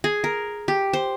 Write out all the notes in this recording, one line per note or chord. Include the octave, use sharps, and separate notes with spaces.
G#4
A#4
G4
C5